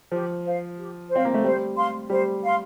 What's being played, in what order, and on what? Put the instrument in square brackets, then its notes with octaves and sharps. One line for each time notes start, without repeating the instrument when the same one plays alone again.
[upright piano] F3 [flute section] G4
[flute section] C5 F5
G4
[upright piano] C4 [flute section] C5 F5
[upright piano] A#3
A3
[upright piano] G3 [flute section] C5
[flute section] F5 C6
[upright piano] G3 [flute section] C5
[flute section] F5 C6